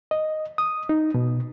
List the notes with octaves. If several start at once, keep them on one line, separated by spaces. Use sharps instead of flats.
D#5
D#6
D#4
B2